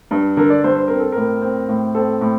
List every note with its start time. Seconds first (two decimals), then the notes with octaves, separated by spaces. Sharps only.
0.11 G2
0.37 D3 A#4
0.50 D5
0.64 G2 C5
0.76 C5
0.88 C4 A#4
1.00 A4
1.12 A2 A#4
1.42 C4
1.69 A2
1.95 C4 A4
2.21 A2